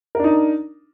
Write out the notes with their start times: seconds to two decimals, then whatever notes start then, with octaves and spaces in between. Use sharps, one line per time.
0.15 A#4
0.19 D4
0.24 D#4